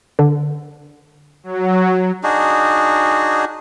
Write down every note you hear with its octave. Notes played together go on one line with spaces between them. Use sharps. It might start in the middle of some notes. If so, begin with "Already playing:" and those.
D3
F#3
D4 D#4 F#4 G#4